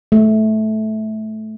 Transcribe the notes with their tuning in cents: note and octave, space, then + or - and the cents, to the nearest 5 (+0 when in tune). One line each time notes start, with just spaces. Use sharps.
A3 -15